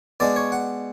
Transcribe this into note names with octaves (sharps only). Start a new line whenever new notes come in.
B2 G#3 D4 D5
C#5
F#5